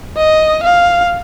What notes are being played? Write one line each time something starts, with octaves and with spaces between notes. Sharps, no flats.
D#5
F5